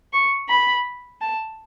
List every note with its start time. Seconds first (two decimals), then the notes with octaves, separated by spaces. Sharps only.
0.13 C#6
0.49 B5
1.21 A5